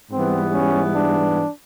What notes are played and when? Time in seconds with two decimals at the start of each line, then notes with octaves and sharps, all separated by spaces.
0.12 G#2 E3 G3 B3 C4
0.53 C#4
0.94 D4